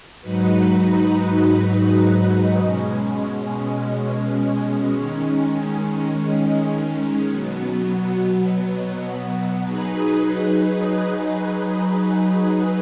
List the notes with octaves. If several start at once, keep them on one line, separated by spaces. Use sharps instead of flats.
G#2 F#3 D#4 F#4 B4
B2 G#3 C#4
D#3 G#3 C#4
B2 F#3 B3
F#3 D#4 G#4 B4